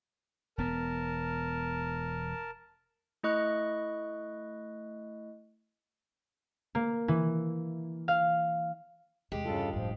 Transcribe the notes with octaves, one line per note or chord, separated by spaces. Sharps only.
E1 B3 A#4 A5
A3 E4 D#5 C#6 F#6
A#3
E3
F5
E2 C3 G#3 G4
G2 C#3 F4 A4
F1 A2 F3